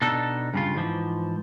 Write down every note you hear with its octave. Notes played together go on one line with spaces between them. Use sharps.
B2 D4 D#4 A4
G2 C#3 F4
G#2 E3 F3